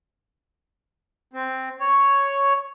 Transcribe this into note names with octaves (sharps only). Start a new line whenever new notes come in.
C4
C#5